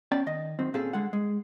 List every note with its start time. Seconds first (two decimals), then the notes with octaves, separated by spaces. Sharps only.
0.12 B3 C#4 D5 G5 A5
0.26 D#3 D#5
0.59 F#2 D#3 C4
0.74 A#2 C4 C#4 G#4 A4
0.93 C#2 D3 G#3 A4 F#5
1.13 G#3